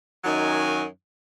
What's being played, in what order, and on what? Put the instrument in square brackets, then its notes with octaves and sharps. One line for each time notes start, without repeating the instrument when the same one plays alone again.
[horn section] F#2 D#3 F#3 D#4 G#5